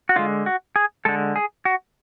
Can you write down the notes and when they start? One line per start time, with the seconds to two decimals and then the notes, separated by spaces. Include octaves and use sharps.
0.09 F#4
0.16 D3 G#3 F4
0.46 F#4
0.76 G#4
1.05 D3 G#3 A4
1.36 G#4
1.65 F#4